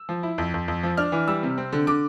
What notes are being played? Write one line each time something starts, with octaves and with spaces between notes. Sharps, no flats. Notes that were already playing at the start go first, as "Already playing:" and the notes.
Already playing: E6
F3
E4
F2
F2
F2
F3
D4 F6
E3
G3 E6
C3
C4
D3
D3 D6